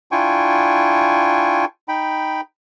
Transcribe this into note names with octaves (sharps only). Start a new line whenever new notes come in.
D4 E4 F4 G5 G#5 C#6
D#4 G5 B5